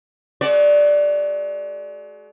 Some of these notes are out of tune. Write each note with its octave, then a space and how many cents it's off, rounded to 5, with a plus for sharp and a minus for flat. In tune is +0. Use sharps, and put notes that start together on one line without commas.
G#3 +40 F#4 +35 D5 +0